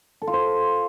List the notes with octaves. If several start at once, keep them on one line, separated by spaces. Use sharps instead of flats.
A4
F4
C5